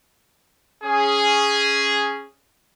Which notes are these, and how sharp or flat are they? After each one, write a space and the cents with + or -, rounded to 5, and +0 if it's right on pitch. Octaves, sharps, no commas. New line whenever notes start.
C#4 +0 G#4 +0